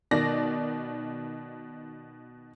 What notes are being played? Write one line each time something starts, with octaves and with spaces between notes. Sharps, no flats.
B2 D#3 D5 A#6